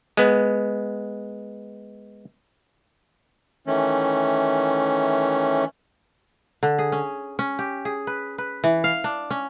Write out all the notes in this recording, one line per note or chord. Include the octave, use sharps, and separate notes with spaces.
G#3 B3
D#3 E3 A3 C#4
D3
G#4
C#4
C#4
G4
G#4
B4
B4
E3
F5
D4
C#4